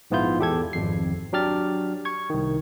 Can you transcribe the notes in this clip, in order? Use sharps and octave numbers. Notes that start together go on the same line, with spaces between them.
A#1 G#2 B3 E4 F4 G6
E2 G4 A4 G#6
G#1 F2 C7
F#3 D4 G4 F6 A6
C#6 G#6
C2 D#3